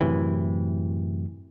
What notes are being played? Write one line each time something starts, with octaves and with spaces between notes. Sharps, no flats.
F#2 A2 C3 E3